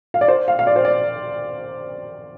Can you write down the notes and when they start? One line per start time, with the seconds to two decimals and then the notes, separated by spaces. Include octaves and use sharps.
0.14 F5
0.21 D5
0.28 C5
0.48 F5
0.59 F5
0.67 D5
0.76 C5
0.85 D5